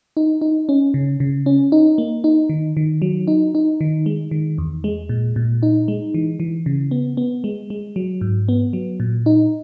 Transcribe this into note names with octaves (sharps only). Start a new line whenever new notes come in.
D#4
D#4
C#4
C#3
C#3
C#4
D#4
A#3
D#4
D#3
D#3
F#3
D#4
D#4
D#3
G#3
D#3
E2
G#3
A#2
A#2
D#4
G#3
E3
E3
C#3
B3
B3
G#3
G#3
F#3
G#2
B3
F#3
A#2
D#4